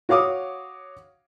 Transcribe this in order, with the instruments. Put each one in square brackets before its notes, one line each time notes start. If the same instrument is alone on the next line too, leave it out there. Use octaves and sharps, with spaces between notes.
[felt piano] F#4 C#5 F5 D6 D#6